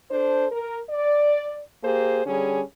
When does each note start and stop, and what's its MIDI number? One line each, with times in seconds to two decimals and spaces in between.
0.10 0.46 62
0.10 0.46 69
0.10 0.46 72
0.51 0.78 70
0.89 1.59 74
1.84 2.22 58
1.84 2.22 67
1.84 2.22 68
1.84 2.22 72
2.26 2.60 50
2.26 2.60 55
2.26 2.60 61
2.26 2.60 68